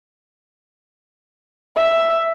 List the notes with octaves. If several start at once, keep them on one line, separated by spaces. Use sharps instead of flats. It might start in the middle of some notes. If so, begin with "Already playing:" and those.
E5